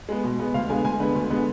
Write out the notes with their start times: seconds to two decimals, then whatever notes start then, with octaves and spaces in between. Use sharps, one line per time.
0.09 G#3 B3
0.24 B2
0.39 G#3 B3
0.54 D2 F5
0.69 D3 G#3 B3 G#5
0.84 D2 G#5
1.00 D3 G#3 B3 B4
1.15 D2
1.30 D3 G#3 B3